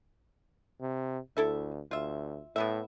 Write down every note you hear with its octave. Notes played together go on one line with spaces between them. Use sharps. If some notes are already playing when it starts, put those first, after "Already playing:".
C3
D2 E4 A4 E5
D2 F4 E5
A2 B3 E4 E5